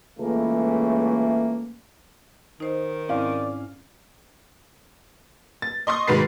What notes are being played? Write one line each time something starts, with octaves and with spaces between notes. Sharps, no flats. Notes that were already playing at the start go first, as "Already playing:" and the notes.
C#2 E3 A3 A#3
D#3 D#4 C5 D#5
G#2 C4 C#4 E4 D5 F5
A6
D#5 C6 C#6 D#6
G#2 D#3 F#4 B4 A6 C7